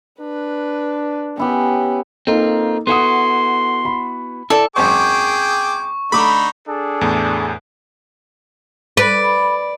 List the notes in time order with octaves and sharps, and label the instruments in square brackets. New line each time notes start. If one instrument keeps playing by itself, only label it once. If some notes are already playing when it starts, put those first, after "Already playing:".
[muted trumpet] D4 [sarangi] B4
[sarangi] B3 [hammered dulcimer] C#4 E4 G4
[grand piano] A#3 D#4 A4 [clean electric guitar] C4 F4
[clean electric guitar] B3 E4 F#4 [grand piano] A4 F#5 D#6 [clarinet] C6
[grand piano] B5
[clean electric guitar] E4 D5 [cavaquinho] A4
[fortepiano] G#1 F#2 C5 [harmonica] G#4 G5 D6 [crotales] C#6
[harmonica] D3 D#4 [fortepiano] A3 D6 [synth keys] B5
[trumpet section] D4 G#4 A4
[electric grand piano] E2 A2
[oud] B4 [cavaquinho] D5